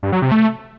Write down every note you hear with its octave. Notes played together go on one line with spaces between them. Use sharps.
G2
F#3
C3
A3